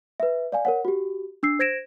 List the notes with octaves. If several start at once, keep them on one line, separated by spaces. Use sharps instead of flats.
B4 E5
D5 F5 G#5
A#4 C#5 F#5
F#4 G4
D4 E6 C7
C5 G#6 A#6 D7 E7